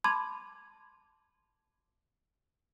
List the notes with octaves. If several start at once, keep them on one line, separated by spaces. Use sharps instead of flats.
A5 B5 C6 D6 G#6